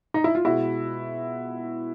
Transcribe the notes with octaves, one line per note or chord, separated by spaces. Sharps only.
D#4
E4
F4
B2 G#3 E4 F#4